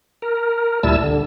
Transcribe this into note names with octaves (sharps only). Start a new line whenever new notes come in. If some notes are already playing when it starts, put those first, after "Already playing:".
A#4
D2 A#2 G3 E4 A5 E6
D3